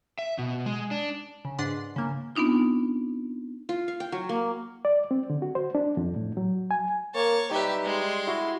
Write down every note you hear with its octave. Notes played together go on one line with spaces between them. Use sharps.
E5
B2
G#3
D4
C#3
G#2 D4 B4 F#5 C6
C#3 A#3
B3 C4 D4 D#4 F4
F4
F5
G5
F#3
A#3
D5
C4
D3
F#4
C5
D4
F2
A2
F#3
G#5
A#3 C#5 A5
G3 D#4 G4 B4 E5
G#3 C6
E4 F#4